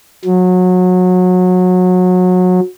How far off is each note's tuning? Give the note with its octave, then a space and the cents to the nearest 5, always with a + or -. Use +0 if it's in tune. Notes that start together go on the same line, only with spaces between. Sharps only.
F#3 -25